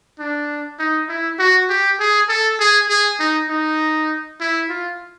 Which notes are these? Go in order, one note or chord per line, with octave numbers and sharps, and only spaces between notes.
D4
D#4
E4
F#4
G4
G#4
A4
G#4
G#4
D#4
D#4
E4
F4